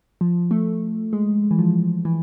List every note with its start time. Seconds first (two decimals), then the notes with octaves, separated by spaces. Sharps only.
0.21 F3
0.51 A3
1.13 G#3
1.51 E3
1.59 F3
2.05 E3